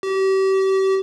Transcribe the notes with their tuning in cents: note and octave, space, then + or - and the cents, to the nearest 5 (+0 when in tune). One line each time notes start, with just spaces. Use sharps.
G4 -35